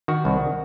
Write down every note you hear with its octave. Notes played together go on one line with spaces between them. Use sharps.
D#3 F#4
C2